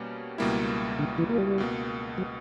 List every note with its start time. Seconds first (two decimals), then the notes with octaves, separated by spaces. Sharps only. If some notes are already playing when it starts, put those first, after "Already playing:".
Already playing: B2 G3 A#3 C#4
0.38 C#2 B2 G3 A#3 E4
0.99 D3
1.18 E3
1.29 A#3
1.38 G3
1.58 C#2 B2 A#3
2.18 F#3